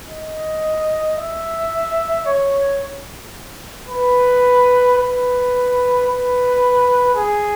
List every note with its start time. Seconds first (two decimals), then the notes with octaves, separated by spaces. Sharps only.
0.09 D#5
1.18 E5
2.26 C#5
3.89 B4
4.98 B4
6.07 B4
7.15 G#4